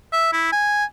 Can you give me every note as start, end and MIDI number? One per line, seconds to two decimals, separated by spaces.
0.12 0.31 76
0.33 0.50 64
0.52 0.85 80